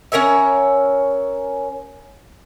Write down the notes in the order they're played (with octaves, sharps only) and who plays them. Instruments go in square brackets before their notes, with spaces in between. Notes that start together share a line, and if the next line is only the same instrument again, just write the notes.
[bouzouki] C#4 A#4 C#5 E5